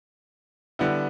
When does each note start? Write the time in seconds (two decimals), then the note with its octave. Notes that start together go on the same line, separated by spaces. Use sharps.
0.79 D3 G3 B3 E4